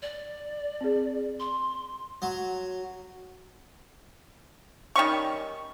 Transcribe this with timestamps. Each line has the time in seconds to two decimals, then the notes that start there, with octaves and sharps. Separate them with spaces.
0.02 D5
0.81 C4 G#4
1.39 C6
2.22 F#3
4.96 D#3 G3 C#4 C#6